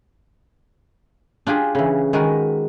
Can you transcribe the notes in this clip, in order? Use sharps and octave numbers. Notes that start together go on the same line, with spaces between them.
D4 F4 G4 G#4
C#3 E3
D#3 G#3 F#4 A#4 B4